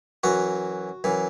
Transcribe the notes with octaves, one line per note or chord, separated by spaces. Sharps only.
F#2 E3 F#4
F#2 E3